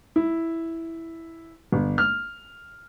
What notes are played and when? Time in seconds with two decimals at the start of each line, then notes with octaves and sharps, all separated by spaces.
0.16 E4
1.72 G1
1.98 F6